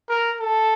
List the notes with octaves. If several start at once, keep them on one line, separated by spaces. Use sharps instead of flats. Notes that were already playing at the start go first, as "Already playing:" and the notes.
A#4
A4